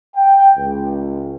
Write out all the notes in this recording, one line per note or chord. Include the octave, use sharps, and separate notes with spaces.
G5
C#2